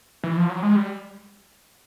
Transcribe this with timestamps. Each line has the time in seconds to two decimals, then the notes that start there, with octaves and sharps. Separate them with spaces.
0.24 E3
0.37 F3
0.49 F#3
0.63 G#3
0.76 G3